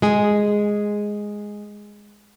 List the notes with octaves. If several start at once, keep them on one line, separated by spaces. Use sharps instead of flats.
G#3 G#4